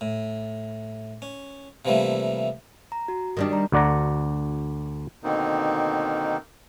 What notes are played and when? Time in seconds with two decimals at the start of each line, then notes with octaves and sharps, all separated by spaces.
0.01 A2
1.22 C#4
1.85 C3 E3 F3 G3 A3 A#3
2.92 A#5
3.08 F#4
3.37 D#3 G3 D4
3.52 D5 A#5
3.72 D2 F#4 D5 F#5 A#5
5.24 B2 D3 D#3 A#3 C4 D#4